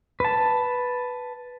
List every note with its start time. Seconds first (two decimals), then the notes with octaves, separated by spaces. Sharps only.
0.20 B4 A5